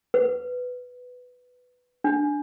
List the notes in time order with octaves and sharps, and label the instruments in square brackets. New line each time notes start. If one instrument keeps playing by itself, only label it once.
[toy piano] B4
D4